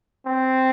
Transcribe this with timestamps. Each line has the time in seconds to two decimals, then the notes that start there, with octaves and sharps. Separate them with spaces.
0.26 C4